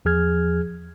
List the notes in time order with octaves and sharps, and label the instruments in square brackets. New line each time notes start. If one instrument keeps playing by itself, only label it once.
[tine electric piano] E2 F3 G#4 F6 G#6